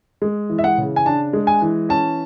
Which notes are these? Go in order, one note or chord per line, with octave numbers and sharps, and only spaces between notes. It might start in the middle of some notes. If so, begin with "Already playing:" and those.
G#3
E3
E5
F#5
C#3
G#5
D4 A5
G#3
G#5
E3
C#4 A5